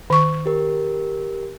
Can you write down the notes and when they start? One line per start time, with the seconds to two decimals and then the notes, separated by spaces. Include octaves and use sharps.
0.10 D#3 C#6
0.46 G4 A#4